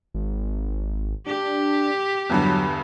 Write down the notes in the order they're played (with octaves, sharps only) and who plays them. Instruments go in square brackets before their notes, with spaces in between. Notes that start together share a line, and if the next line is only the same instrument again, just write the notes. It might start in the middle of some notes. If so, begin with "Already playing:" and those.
[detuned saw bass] G#1
[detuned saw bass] D4 [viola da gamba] G4
[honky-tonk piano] E2 G2 D3 [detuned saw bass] F#3